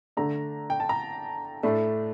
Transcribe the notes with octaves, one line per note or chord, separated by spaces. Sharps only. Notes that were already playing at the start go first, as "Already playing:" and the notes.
D3 A3 D4 A#5
G5
A5
A#5
A2 A3 D4